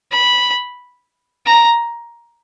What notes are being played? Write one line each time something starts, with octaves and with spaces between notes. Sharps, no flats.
B5
A#5